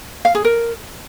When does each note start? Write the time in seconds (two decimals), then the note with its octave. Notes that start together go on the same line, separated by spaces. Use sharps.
0.25 F5
0.35 G#4
0.44 A#4